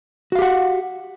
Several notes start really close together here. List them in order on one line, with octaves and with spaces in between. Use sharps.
F#4 F5 G4 F#5